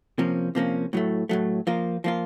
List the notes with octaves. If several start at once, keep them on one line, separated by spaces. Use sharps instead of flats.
C3 F3 A#3 C#4
C3 F3 A#3 C#4
A2 F#3 A3
A2 F#3 A3
F3 A#3 F4
F3 A#3 F4